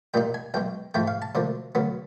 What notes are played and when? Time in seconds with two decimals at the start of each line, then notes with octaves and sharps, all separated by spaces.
0.14 A#2 G3 A#3 D#4 G5
0.34 G#5
0.54 B1 B2 G#3 G5
0.94 G#2 F3 A3 G5
1.07 F5
1.22 A5
1.35 D2 C3 F3 A#3
1.75 D2 C#3 F#3 B3